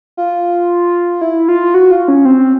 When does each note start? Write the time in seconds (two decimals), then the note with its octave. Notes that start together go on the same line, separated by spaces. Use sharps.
0.17 F4
1.21 E4
1.49 F4
1.74 F#4
1.91 F4
2.08 C#4
2.25 C4